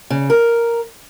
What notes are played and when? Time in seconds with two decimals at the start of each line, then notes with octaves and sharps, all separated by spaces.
0.10 C#3
0.30 A#4